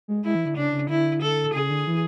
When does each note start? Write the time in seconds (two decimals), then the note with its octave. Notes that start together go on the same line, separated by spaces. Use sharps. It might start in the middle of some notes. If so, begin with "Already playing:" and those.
0.08 G#3
0.24 G#3 E4
0.35 E3
0.45 D3
0.57 C#3 D4
0.72 C#3
0.89 D3 E4
1.22 A4
1.54 C#3 G#4
1.70 D3
1.87 E3